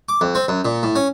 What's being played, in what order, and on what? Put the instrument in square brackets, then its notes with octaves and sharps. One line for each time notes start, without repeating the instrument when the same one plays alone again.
[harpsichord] D6
F2
C4
F#2
A#2
A2
C#4